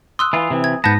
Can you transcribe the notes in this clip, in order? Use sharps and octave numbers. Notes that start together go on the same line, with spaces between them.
C6 D#6 E6 F#6
E3 F4
C3 E3
G#6
G#2 B3 A5 G6 A#6